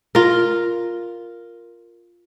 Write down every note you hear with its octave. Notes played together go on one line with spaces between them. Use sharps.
F4 A#4